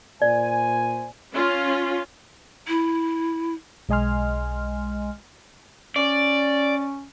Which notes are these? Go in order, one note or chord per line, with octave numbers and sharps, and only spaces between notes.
A#2 C5 D5 G#5
C#4 F4
E4
B1 G#3 D#5 G#5 C6 F6
C#4 D5